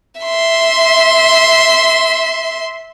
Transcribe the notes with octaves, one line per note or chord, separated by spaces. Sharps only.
E5 C6